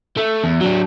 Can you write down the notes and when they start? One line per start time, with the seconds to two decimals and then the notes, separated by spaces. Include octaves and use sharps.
0.17 A3
0.44 E2
0.61 F#3 D4